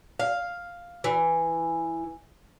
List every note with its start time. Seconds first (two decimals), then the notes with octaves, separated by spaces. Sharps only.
0.20 F5
1.04 E3